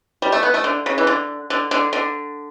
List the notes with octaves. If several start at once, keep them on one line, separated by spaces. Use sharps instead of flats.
G3
A3
B3
A3
D3
C#3
E3
D3
D3
D3
D3